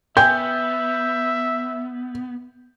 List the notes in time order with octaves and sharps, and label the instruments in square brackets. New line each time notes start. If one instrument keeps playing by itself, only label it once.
[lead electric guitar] B3 [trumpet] E5 [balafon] G5 G#5 [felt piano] G6